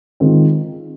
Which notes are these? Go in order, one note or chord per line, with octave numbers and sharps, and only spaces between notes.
D#3 G#3 C4 F4